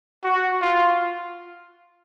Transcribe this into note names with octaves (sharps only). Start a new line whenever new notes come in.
F#4
F4